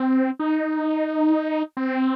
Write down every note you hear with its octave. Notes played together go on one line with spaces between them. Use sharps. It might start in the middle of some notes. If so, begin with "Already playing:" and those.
Already playing: C4
D#4
C4